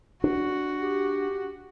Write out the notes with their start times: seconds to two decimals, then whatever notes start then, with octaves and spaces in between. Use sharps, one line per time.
0.24 D4 F#4
0.80 G4